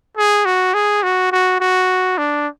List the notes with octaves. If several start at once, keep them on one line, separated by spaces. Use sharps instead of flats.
G#4
F#4
G#4
F#4
F#4
F#4
D4